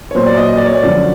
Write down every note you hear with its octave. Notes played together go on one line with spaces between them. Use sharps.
C#5
A#2 F#3 C5
D5
D#5
D#5
D5
C#5
D5
F#2 D3 F3